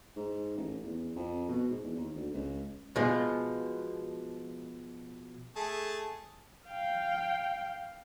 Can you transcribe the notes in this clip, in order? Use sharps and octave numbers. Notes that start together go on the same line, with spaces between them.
G#2
A1
E2
F2
B2
G#2
E2
D#2
D2
C#2
B2 F3 G#3
A3 G#4 A5
F5 G5